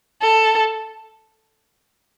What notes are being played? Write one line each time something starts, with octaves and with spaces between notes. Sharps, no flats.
A4